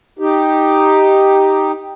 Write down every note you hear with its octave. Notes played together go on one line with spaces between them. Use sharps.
D#4 G4